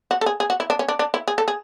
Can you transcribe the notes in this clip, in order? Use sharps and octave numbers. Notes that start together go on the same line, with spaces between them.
F#4
A4
G#4
G#4
F#4
E4
D4
C#4
D4
D4
E4
G#4
A4
G#4